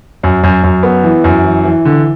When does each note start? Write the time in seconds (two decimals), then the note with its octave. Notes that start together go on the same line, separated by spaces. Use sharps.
0.23 F#2
0.43 F#2
0.63 F#2
0.83 B3
1.03 E3
1.24 F#2
1.44 E3
1.64 E3
1.85 D3